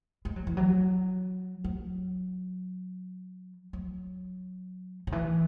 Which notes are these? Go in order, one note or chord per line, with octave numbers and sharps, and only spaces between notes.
G#3
F#3
E3
F#3
F#3
F#3
C#3
E3